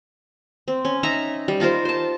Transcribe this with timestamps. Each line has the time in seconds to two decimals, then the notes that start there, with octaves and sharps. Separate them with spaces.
0.68 C4
0.85 C#4
1.03 D#4 E5 A#5
1.48 G3
1.60 D#4 F4 A#4 C5
1.85 C5 A5